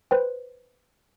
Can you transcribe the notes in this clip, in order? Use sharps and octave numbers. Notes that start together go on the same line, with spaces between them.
B4 C5 G5